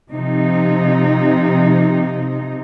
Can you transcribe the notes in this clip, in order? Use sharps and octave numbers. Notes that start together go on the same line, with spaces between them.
C3 F3 D#4